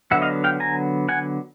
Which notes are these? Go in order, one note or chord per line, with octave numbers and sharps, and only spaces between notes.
D3 F#3 B3 E5 F#5
D#5 F5
F5 G5
G#5 A#5
F#5 G#5